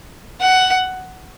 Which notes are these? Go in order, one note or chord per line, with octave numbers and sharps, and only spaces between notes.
F#5